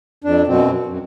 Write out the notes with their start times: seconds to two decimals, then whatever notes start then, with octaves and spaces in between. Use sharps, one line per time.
0.24 F2 D4
0.47 F#2 B2 C4
0.86 F#2